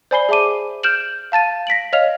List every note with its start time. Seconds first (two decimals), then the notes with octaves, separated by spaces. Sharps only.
0.11 C5 D5 G#5 B5 C7 G7
0.29 G#4 E5 A5 D6 D#7
0.83 F6 G6 D7 E7 F#7
1.32 F5 A5 A6 D#7
1.67 A#6 B6 D7 F#7
1.93 C#5 D#5 F5 F6 F7